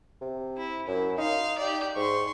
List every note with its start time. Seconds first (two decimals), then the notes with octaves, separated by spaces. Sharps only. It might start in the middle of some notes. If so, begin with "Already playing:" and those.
0.21 C3
0.57 E4
0.88 F#2 E4
1.18 D#4 F5 C6
1.58 G4 D5
1.96 G#2 C6 C#6